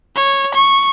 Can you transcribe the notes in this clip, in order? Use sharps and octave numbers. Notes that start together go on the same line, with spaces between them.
C#5
C#6